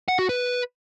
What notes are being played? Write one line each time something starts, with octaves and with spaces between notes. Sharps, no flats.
F#5
F#4
B4